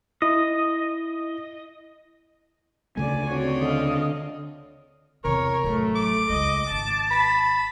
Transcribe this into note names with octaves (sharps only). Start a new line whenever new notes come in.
E4 D#5
D2 C#3 A3 D5 G#5
C4 F#4 C#5 D5
D3 D#5 F5
E2 C3 A#4 C#5
A1 F#3 A3
D6
C#2 G#3 D#5
G#1 A5
B5